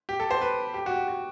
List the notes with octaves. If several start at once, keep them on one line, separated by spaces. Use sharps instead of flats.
G4
A4
C5
B4
G4
F#4
G4
F#4